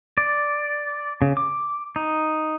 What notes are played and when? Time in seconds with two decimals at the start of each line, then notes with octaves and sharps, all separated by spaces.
0.18 D5
1.22 C#3
1.37 D6
1.96 D#4